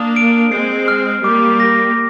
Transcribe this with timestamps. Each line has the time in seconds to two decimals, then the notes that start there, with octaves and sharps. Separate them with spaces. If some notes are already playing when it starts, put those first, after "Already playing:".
Already playing: A#3 D4 D#6
0.16 D7
0.52 G#3 C4 C7
0.88 F6
1.23 G3 A#3 D6
1.60 A#6